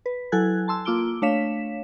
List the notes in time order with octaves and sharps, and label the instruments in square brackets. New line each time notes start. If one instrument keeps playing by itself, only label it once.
[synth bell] B4
F#3 E4 A4 G#5 F#6 G#6
A5 C6 E6
A#3 F4 D6 E6 D7 G7
A3 D4 C#5 F5 B6 E7